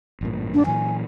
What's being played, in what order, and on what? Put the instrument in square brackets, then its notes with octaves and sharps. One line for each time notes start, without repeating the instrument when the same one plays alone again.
[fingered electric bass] A1 G2 A#2
[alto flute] D4
[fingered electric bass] A#2 E3 F#3 [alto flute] G#5